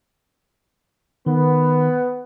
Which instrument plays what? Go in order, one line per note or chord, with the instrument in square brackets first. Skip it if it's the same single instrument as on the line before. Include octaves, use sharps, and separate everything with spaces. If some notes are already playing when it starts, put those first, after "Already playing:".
[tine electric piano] D#3 [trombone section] B3